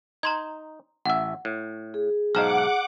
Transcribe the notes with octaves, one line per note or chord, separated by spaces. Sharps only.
D#4 A#5 C6 G#6
A1 E5 F#5
A2
G#4
B1 G#2 D#5 F5 F#5 A#5 D6 F6